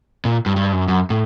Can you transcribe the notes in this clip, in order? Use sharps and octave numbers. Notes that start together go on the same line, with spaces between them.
A#2
G2
G2
F#2
F#2
A2